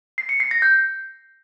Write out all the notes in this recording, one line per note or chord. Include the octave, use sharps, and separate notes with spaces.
C7
C#7
C7
A#6
G6